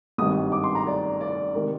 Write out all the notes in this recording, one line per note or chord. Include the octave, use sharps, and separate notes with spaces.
G#1 G2 D#3 D#6
D6
C6
A#5
D5
D5
C3 D#3 G#3 A#4